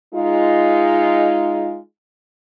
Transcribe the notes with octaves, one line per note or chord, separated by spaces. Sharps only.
G#3 D#4 F4